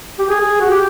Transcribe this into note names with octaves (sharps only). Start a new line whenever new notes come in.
G4
G#4
G#4
F#4
G4